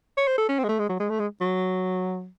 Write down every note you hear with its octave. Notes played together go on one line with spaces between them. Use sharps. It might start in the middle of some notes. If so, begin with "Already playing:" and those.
C#5
C5
A4
C#4
C4
G#3
A3
G#3
F#3
G#3
A3
G#3
F#3